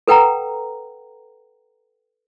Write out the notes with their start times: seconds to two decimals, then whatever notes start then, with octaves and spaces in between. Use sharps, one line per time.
0.08 A4 B4 F#5 G5 A#5